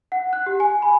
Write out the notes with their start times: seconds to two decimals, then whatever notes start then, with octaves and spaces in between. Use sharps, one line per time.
0.12 F#5
0.33 F#6
0.46 G4
0.60 G#5
0.82 B5